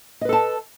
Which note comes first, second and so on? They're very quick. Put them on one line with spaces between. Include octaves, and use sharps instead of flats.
D#5 B4 A4 A5